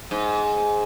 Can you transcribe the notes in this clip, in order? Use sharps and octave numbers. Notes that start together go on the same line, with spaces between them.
G#2